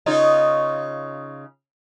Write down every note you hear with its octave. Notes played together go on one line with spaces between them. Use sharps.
C#3 D#4 F4